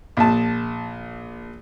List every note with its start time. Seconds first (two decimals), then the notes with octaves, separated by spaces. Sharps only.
0.17 A#1 A5